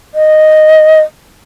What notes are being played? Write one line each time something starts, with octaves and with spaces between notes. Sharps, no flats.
D#5